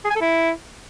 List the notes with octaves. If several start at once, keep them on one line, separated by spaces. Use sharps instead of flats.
G#4
G#5
A4
E4